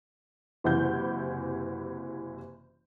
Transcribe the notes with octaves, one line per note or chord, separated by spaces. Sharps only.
F#1 C3 E3 E4 F#5 G6